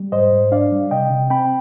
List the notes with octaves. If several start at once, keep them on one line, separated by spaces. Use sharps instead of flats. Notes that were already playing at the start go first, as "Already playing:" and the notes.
Already playing: G3
G#2 C5 D#5
G#2
D4 D5 F5
G3
C3 D#5 G5
C3
C4 G5 B5